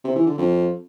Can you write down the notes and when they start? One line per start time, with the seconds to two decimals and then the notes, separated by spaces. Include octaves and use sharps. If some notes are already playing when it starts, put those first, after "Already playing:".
0.04 C3
0.15 E3
0.27 D3
0.38 F2